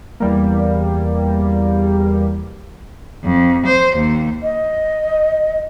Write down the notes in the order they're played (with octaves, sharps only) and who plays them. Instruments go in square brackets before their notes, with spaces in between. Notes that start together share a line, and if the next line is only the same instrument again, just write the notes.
[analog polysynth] E2 G3 A#3
[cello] F2
C5
D#2
[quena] D#5